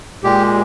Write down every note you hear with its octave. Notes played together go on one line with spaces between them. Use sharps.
A#2 G#3 G4